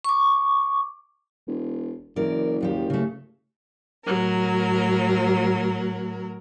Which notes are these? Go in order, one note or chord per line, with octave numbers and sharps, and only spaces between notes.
C#6 D6
E1
F#1 E3 A#4 D5
D#2 F3 G4
C#3 A3
A2 F#3 A#4